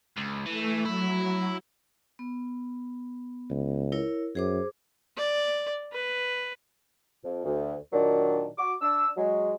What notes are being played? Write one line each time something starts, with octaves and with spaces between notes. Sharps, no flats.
C#2
E3 A3
F#3 E4
B3
C#2
E4 A#4 C#5
F#2 G#4 C5 D6
D5
B4
F2
D2
A#2 D#3 F#3 D4
F#4 D6
D4 E6
F#3 G#3